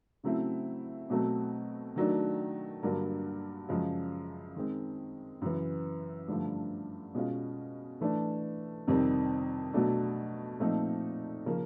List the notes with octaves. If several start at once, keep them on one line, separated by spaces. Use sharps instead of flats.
C#3 F#3 A3 C4 E4
B2 F#3 A3 C4
D#3 F#3 A3 D4
G2 D3 F#3 A#3
F#2 C#3 F3 G#3
D#3 G#3 C4
F#2 C#3 E3
G2 D3 F3 A3
B2 G#3 C#4 F4
E3 A3 D4
F2 C3 D#3 G3 C4
B2 F#3 A3 D4
A#2 F3 A3 C4 D#4
C#3 F3 A#3 C#4